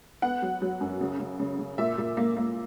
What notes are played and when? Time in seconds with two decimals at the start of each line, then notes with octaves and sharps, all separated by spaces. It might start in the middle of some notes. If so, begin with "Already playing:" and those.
0.22 B3 F#5
0.42 F#3
0.62 F#3
0.81 F#2
1.01 C#3
1.20 C#3
1.40 C#3
1.59 C#3
1.78 A#2 E5
1.98 A#2
2.17 A#3
2.37 A#3